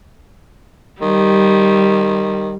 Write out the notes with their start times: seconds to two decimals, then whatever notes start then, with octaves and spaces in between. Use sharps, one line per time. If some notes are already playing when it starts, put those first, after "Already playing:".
1.01 D#3 G3